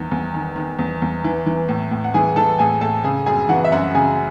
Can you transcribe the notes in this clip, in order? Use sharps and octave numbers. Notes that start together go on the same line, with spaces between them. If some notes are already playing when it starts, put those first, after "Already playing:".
Already playing: E2 D#3
E2
D#3
D#3
E2
E2
E3
E3
A2
A2
F#5
E3 G#4 G#5
E3 A4 A5
A2 G#4 G#5
A2 A4 A5
C#3 G#4 G#5
F#2 G#4 G#5
E3 F#4 F#5
E5
F#2 F#4 F#5
C#3 G#4 G#5